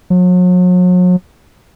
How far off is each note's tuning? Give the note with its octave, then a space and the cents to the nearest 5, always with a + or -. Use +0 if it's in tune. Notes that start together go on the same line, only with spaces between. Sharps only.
F#3 -40